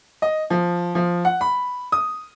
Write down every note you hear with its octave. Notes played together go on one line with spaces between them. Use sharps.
D#5
F3
F3
F#5
B5
D#6